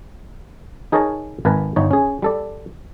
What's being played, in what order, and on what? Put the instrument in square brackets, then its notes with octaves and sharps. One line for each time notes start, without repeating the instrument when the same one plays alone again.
[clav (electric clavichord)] D#4 G#4 A#4 C#5 D#5 A5
G#1 A#4 B4 G#5 A5
G1 D#4 C#5
C#4 G#4
G3 A4 D5